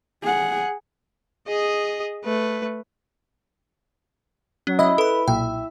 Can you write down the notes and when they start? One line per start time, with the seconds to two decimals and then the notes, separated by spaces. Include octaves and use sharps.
0.22 G#4 F#5
1.48 G#4 D#5
2.25 A3 B4
4.67 F#3 C#4
4.79 E4 D#5
4.98 A4 B4 B5
5.28 B1 A#2 E5 G5